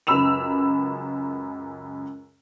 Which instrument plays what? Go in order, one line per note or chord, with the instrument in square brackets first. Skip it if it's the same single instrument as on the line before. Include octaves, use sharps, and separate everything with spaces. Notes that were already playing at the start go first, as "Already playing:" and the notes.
[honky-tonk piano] C#2 F#2 B5 E6 E7 F7